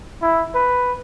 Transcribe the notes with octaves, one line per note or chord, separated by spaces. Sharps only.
E4
B4